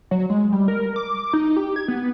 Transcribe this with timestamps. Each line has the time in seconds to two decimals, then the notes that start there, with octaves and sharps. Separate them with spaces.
0.11 F#3
0.30 G#3
0.52 G3
0.68 A#4
0.96 D6
1.33 D#4
1.56 G4
1.76 G#6
1.88 B3